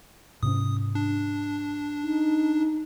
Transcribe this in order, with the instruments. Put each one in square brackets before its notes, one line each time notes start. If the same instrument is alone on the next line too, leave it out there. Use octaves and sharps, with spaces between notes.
[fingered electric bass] G#2 C3 C#4 [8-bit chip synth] D#6
[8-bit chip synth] D4
[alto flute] D#4